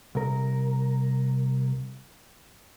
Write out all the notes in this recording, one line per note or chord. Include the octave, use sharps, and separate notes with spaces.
C2 A#4